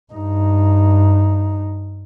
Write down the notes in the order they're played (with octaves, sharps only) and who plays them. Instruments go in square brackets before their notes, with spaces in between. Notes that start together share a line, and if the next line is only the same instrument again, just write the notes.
[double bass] G2 D#4